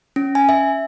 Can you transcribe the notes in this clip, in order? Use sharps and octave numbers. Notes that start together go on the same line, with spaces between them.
C#4
G#5
E5